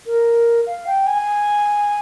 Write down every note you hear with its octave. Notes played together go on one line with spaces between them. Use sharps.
A#4
F5
G5
G#5